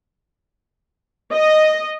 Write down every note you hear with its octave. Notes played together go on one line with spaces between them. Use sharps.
D#5